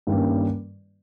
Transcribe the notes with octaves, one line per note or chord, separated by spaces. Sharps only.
G2 D#3 G3 A#3 C#4